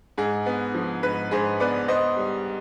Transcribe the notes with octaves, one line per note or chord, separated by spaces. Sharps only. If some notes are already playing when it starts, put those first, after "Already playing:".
G#2 G#4
B3
F3
G#2 B4
G#2 G#4 C5
B3 B4 D5
B3 C5 D#5
G3